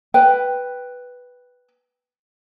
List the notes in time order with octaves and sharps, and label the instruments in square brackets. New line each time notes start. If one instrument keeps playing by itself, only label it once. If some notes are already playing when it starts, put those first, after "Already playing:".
[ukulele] B4 G5